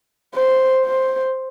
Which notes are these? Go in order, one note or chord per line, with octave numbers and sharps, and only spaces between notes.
C5
C5